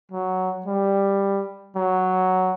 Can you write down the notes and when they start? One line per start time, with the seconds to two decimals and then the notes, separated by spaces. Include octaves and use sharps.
0.11 F#3
0.66 G3
1.76 F#3